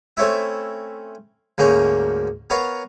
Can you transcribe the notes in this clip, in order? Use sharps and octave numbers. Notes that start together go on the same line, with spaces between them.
A3 C4 C#4 E4 E5
D2 G#2 A#3 C#4
B3 A#4 C#5 F5